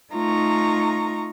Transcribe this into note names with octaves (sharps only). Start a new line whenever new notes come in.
A3 D#4 F4 A#5 C#6